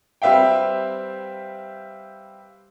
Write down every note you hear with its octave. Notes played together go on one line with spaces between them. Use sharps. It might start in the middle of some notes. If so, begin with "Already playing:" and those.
G3 C4 B4 E5 F5 G5